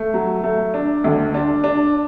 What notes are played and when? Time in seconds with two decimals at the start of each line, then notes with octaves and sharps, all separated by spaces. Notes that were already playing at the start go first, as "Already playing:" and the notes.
Already playing: A3
0.14 F#3
0.44 A3
0.74 D4
1.04 D2
1.34 D4
1.64 D4